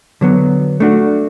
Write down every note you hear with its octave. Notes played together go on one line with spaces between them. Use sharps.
D3 F#3 B3
A3 D4 F#4